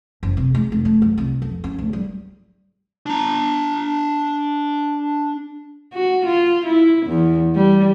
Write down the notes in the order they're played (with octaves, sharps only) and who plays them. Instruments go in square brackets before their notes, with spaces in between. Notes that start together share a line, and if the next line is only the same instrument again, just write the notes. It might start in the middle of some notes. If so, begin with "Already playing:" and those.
[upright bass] F#1
C3
G#3
F1
A3
F#2
C2
F2
C#4
D2
G3
[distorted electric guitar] D4 A#5
[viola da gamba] F#4
F4
E4
E2
G3